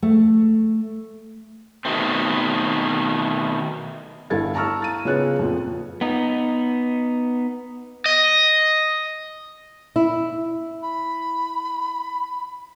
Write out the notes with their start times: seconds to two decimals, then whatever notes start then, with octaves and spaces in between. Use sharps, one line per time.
0.02 A3
1.85 B2 D#3 A3 C4
4.30 G1 E4 A4 F5 G#6 A6
4.55 A5 A#5 C#6 E6 F6
4.82 A6 D#7
5.05 C#3 B3 F4 G#4 C#5 F#6
5.39 F2 A#2 F3
6.01 B3 D#4
8.06 D#5
9.96 E4
10.83 B5